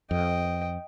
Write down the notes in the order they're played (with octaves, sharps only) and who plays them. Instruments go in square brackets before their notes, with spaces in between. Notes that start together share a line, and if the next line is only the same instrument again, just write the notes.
[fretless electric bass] F2 [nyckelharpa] D#5 G5